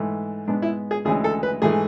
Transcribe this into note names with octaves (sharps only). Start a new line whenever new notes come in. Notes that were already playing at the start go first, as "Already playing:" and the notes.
Already playing: G#2 E3 A3
G#2 G#3 B3 D4
E4
G#4
D2 C#3 E3 G#3 G#4
A4
B4
G#2 E3 A3 G#4